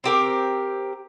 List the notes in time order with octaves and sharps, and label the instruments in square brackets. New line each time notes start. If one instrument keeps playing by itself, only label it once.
[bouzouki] C4 G4 A#4